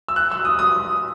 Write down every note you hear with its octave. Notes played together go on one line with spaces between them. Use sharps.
E6
F#6
E6
D#6
D#6